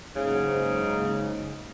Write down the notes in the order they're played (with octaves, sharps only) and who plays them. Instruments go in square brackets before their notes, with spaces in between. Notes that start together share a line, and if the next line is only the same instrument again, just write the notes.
[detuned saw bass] F#1 [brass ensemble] G#2 [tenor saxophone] C#3